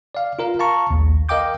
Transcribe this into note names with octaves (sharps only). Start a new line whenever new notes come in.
D5 F5
F4 A#4 F5
F5 A5 A#5 C#6
A#1 D#2
A#4 D#5 F5 G5 D6 G6